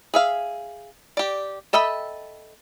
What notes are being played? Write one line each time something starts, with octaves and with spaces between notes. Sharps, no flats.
G#4 E5 F5
G4 D5
A4 D#5 E5 G5 B5